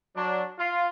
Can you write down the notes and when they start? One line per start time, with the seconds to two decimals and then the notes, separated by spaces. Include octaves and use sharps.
0.16 F#3 D4
0.59 F4